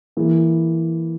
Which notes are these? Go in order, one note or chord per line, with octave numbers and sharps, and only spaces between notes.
E3 A#3 E4 G#4